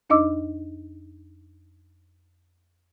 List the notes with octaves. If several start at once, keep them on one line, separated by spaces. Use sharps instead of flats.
F2 D4 D#4 D#5 D6 E6